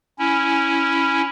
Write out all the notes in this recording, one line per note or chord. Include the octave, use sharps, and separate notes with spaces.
C#4 E4